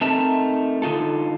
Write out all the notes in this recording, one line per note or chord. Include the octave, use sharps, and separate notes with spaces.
A3 C4 D#4 A#4 E5 A5
D3 D#4 F4 A4